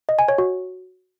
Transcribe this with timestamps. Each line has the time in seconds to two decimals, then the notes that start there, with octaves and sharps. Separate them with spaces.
0.09 D#5
0.19 G#5
0.28 C#5
0.38 F#4